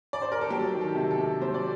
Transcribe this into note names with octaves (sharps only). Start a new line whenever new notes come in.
D5
C5
A#4
A4
F#3 G4
D#3
A4
C3
A4
C3
F#3 C5
D5